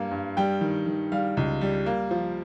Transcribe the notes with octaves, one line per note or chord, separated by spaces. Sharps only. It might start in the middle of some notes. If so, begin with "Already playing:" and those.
Already playing: G2 G3 A#3
G2
G3 G5
D#3
D#3
G3 F5
C#2
G3
A#3
F3